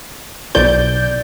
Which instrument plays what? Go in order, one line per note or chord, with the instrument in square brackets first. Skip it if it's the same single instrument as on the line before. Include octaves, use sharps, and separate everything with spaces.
[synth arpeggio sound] B1 G6 [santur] D5